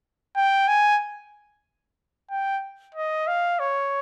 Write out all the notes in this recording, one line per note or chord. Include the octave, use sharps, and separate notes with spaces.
G5
G#5
G5
D#5
F5
C#5